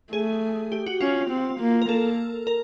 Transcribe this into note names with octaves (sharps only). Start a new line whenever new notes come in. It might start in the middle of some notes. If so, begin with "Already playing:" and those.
A3 G#4
G4
F#4
C#4 F4
C4
A#3
A#4
A#3 A4
A#4